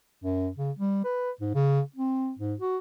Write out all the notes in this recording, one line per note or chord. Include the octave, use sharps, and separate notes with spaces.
F#2
C#3
G3
B4
G#2
C#3
C4
G#2
F#4